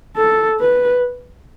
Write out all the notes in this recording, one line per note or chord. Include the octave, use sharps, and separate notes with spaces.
A4
B4